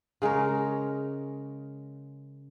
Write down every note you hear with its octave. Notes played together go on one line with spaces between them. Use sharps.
C#3 G#3 C#4 A#4